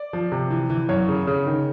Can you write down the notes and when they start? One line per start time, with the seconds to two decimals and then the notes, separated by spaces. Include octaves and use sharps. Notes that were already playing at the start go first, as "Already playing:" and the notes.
Already playing: D5
0.13 F3
0.32 C3
0.50 E3
0.70 E3
0.89 F#2 C#5
1.09 C#3
1.27 C#3
1.46 D#3